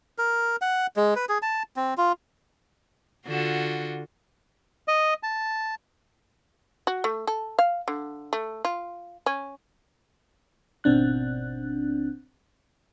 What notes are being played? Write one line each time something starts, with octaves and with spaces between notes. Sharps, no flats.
A#4
F#5
G#3
B4
G#4
A5
C4
F4
D3 F4 F#4
D#5
A5
F#4
A3
A4
F5
D3
A3
F4
C#4
G#1 B2 C4 D4 F#6